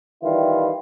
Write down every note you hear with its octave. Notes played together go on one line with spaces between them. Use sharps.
D#3 E3 G3 E4 F4